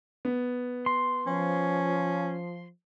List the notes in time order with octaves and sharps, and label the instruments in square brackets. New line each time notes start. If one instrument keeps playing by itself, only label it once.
[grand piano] B3
[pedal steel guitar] C6
[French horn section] F3 [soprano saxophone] C#4